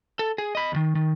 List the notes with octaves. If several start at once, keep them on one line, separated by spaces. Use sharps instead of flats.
A4
G#4
D#5 B5
D#2 D#3
D#3